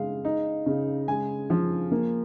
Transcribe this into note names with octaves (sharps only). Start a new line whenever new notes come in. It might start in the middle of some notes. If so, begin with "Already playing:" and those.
Already playing: C#3 G#3 F5
D#4
C#3
G#3 G#5
F3
A#3